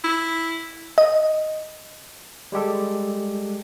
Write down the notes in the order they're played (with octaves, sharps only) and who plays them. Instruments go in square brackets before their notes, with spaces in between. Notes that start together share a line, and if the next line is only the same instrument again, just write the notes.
[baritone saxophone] E4
[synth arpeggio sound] D#5
[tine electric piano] G3 G#3 G4 A4